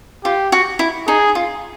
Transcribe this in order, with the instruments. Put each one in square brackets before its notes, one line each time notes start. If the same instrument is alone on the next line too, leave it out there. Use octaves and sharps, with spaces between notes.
[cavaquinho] F4 [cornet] G4
[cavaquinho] F#4
E4
[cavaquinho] D#4 [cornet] G#4
[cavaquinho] F4